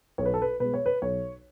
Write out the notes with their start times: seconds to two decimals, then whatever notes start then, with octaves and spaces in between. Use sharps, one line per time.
0.18 B1 C#5
0.26 B4
0.34 A4
0.42 B4
0.60 B2 G#3 B4
0.74 C#5
0.86 B4
1.02 B1 C#5